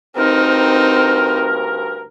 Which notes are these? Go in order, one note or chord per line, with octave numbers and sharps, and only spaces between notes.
D2 G2 C4 D#4 A#4